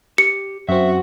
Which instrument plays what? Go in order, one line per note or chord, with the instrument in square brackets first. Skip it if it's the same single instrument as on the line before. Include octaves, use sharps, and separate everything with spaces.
[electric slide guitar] G4 [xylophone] C#7
[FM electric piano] F#2 C4 [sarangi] F#4 [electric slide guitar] E5